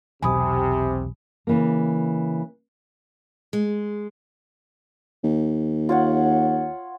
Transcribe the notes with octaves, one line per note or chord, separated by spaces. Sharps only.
B1 E2 C3 G#5 B5 D#6
C#3 E3 A#3
G#3
D#2
F4 C#5 F#5